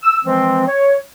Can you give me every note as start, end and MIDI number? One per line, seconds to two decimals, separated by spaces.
0.03 0.19 88
0.25 0.66 52
0.25 0.66 53
0.25 0.66 56
0.25 0.66 60
0.68 0.96 73